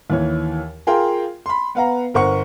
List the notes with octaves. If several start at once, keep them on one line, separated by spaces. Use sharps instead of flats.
D#2 E3 C#5
F4 G#4 A#4 F5 G5 C6
B5 C6
B3 B4 F5 F#5 A#5
G1 A#4 C5 F#5 C#6 C#7